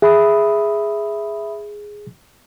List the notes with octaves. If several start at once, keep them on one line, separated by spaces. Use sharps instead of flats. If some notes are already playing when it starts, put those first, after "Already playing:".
G#4 E5 B5 D#6